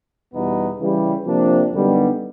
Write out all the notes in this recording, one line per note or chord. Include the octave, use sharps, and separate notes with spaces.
E2 B2 G3 B3 D#4
C#3 E3 G3
C3 F3 A#3 D4
F#2 D3 G3 B3 D#4